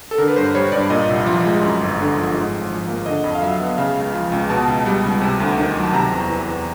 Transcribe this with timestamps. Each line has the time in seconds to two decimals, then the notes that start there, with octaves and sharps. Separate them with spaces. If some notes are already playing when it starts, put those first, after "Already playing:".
0.11 A4
0.18 D3 A#4
0.28 B4
0.36 G2 C5
0.54 G3 C#5
0.72 G2 D5
0.90 A#2 D#5
1.08 C2
1.26 F3
1.44 G#3
1.63 F#2
1.80 G1
1.98 D3
2.16 F3
2.34 G#2
2.53 G#1
2.70 F3
2.88 A#3
3.06 D3 D#5
3.24 F2
3.35 F5
3.42 F#3 E5
3.60 B3
3.78 C#3 F5
3.96 C#2
4.14 F3
4.32 C#2
4.50 B2 A5
4.68 C#2
4.86 G3
5.04 C#2
5.22 C3
5.40 D2
5.58 D#3
5.76 F#3
5.84 A5
5.93 C3 A#5
6.12 E2
6.29 E3
6.47 E2